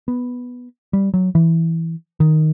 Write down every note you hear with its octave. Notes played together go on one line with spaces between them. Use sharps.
B3
G3
F#3
E3
D#3